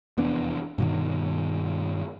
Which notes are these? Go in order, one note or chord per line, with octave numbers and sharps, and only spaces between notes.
F1 E2 B3 D4
G2 B2 D#3